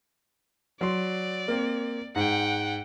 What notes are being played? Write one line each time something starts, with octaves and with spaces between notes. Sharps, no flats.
F#3 D5 C6
A#3 C4
G#2 F#5 G5